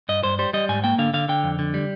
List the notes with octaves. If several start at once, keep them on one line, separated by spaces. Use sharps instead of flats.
G2 D#5
G2 C5
G3 C5
G3 D#5
G#2 G#5
A#3 G5
D3 F5
D3 F5
D3 G5
F2
D3
G3